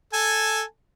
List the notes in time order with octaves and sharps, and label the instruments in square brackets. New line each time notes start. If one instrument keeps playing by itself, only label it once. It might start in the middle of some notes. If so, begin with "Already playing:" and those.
[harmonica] A4 G#5 A5